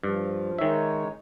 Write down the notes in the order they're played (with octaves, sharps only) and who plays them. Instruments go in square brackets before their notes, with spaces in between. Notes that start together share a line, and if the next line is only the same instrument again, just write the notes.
[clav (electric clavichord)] G2 [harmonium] F3
[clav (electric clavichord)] D#3 E5 [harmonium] G#3 D#4 C#5